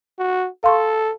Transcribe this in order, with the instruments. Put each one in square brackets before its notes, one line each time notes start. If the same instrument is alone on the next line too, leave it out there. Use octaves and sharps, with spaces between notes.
[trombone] F#4
[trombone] A4 [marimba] F5 C6 C#6